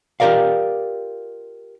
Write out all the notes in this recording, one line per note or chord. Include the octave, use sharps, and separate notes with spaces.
F4 G4 G#4 A#4 D5 F5